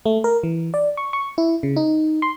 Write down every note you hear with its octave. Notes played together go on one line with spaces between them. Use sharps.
A3
A#4
E3
D5
C#6
C#6
E4
C#3
D#4
C6